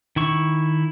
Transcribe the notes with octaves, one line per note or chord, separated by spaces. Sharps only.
D#3 E4 C#6